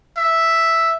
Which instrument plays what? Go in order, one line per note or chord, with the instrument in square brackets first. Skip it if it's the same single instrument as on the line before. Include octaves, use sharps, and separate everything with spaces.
[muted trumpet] E5